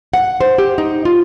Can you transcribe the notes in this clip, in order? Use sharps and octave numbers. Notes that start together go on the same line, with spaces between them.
F#5
C5
G4
D#4
F4